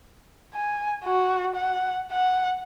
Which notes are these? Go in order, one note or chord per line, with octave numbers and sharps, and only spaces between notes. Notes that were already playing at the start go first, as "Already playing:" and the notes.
G#5
F#4
F#5
F#5